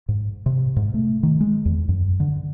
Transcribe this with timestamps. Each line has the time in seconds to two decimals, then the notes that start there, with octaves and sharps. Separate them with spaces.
0.08 G#2
0.46 C3
0.76 G#2
0.94 A3
1.23 D#3
1.41 G#3
1.66 E2
1.89 F#2
2.20 D3